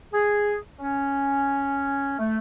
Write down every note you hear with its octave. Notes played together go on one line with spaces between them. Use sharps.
G#4
C#4
A3